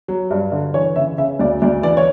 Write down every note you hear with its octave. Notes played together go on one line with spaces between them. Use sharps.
F#3
G2
D3
E3 C#5
C#3 E5
C#3 E5
D2 D5
D2 D5
E3 D5
C#5